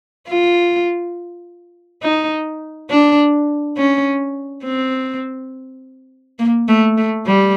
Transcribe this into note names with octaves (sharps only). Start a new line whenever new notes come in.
F4
D#4
D4
C#4
C4
A#3
A3
A3
G3